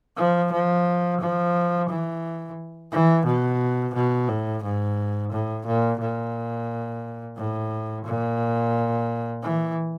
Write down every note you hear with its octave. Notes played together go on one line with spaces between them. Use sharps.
F3
F3
F3
E3
E3
B2
B2
A2
G#2
A2
A#2
A#2
A2
A#2
E3